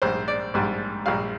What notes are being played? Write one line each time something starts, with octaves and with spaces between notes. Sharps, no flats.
A#1 G#2 G3 C5
D5
A#1 G#2 G3
A#1 A#2 G3 F5